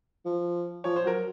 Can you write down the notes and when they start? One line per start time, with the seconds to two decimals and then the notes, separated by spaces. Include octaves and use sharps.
0.25 F3
0.84 F3 C#5
0.96 C5
1.04 F#3 A#4